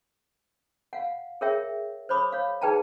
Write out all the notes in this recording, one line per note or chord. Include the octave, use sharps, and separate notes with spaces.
F5 F#5
G#4 A#4 C#5 E5 G5
C5 C#5 B5 D6 D#6
C#5 F5
D#4 G#4 B4 G5 A5 A#5